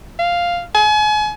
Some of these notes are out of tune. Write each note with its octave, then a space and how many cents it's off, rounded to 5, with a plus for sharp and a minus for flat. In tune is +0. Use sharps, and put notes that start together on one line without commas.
F5 +0
G#5 +35